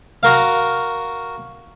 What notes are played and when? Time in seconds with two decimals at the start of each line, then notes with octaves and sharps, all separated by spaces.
0.23 F#4 A#4 F5